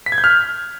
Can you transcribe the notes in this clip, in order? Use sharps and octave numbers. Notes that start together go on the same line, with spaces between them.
B6
G#6
G6
F6